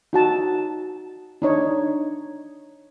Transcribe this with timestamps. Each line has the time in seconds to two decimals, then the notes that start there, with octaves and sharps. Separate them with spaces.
0.13 D#4 F#4 A5
1.42 D4 D#4 C#5